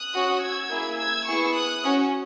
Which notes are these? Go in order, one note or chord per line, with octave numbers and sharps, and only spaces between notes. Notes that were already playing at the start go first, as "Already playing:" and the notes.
Already playing: D#6 F#6
C#4 F#4
E6 G#6
A#3 E4 G#4
E6 G#6
B3 E4 G#4 C#6 E6
D#6 F#6
C#4 F#4